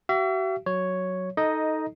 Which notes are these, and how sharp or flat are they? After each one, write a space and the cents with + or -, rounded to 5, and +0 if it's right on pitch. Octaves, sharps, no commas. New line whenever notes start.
F#4 +45 E5 +40
F#3 +0 C#5 +0
D#4 +10 A4 +0 D#5 +0